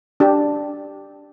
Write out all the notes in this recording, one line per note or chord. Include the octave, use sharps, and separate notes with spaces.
D4 G4